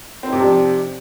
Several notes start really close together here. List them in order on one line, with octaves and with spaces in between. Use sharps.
C4 D#4 C3 F3 D4